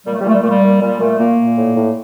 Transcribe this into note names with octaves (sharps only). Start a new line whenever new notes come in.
A#2 G3
A3
G3
A#2 A3
G3
A#2 A3
G3
A#2
A#2 G3
A#2 A3
A#2 A#3
A#2
A2
A2